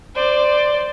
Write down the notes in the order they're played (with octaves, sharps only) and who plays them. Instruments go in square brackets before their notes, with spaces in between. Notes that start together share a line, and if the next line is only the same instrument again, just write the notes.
[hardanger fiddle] C5 D5